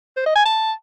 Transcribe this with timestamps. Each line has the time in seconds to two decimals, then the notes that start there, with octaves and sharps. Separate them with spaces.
0.16 C5
0.26 D#5
0.35 G#5
0.45 A5